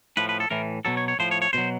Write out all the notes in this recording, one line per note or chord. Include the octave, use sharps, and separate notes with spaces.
A2 F3 B4
B4
A4
A2 E3 A#4
B2 F#3 A4
C#5
C#5
A2 F3 C5
C#5
C#5
B2 F#3 C5